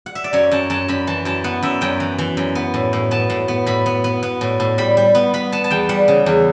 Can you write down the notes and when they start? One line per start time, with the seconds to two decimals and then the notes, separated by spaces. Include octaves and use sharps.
0.06 F#5
0.15 E5
0.24 D5
0.33 F#2 C#5
0.51 F#2 A5
0.70 F#2 A5
0.88 F#2 B5
1.07 E3 A5
1.25 F#2 A5
1.44 B3 F#5
1.63 F#2 E5
1.81 F#2 G5
2.00 E3
2.18 E3
2.37 F#2
2.55 B3
2.74 A2
2.93 A2
3.11 B3 A5
3.30 A2
3.48 B3
3.66 A2 B5
3.86 B3
4.04 B3
4.23 B3
4.41 A2
4.60 A2
4.78 G3 B5
4.97 G3
5.15 B3
5.34 B3 B5
5.52 B3 A5
5.64 A5
5.71 E2 G5
5.89 G3 F#5
6.08 C#3
6.26 E2